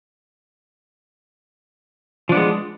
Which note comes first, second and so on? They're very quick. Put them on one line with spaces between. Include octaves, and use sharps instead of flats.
F3 D4 B3 G#3